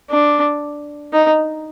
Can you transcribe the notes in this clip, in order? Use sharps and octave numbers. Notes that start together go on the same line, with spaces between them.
D4
D#4